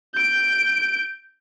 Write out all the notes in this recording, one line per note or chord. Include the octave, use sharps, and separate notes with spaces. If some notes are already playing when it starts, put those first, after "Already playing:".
G6 D7